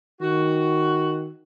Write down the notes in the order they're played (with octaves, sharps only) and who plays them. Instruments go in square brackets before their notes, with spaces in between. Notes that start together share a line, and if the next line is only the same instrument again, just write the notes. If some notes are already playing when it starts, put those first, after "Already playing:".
[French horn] D#3 [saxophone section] F#4